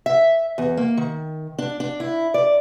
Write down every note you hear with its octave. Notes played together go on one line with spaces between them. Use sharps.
E5
E2
A#3
D#3
D4
D4
E4
D5